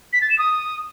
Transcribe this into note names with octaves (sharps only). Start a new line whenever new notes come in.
B6
A6
E7
D#6